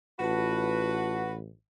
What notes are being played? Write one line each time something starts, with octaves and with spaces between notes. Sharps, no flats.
A1 F4 F#4 B4 A5